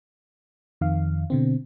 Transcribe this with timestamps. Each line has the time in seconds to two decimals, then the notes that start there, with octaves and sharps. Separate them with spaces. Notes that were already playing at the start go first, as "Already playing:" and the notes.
0.81 F2 D#3 F5
1.30 B2 D3 C4